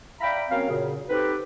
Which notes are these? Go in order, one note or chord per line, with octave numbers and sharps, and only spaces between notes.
D5 E5 F5 G5 A#5 B5
F#3 A#3 C4 C#4 F5
F#2 A#2 C#3
B3 C4 D#4 G4 A4 B4